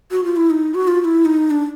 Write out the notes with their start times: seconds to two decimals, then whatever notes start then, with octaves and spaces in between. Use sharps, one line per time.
0.11 F#4
0.24 F4
0.36 E4
0.50 D#4
0.75 F#4
0.88 F4
1.01 F4
1.05 E4
1.25 D#4
1.50 D4